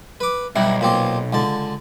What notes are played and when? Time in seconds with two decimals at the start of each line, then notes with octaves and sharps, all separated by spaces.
0.20 B4 D6
0.56 B1 G3 E4
0.81 A#2 C4 G4
1.33 C#2 D3 A5